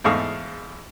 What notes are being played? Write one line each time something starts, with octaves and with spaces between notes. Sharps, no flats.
E2 G#2 A3 F5 C#6 D#6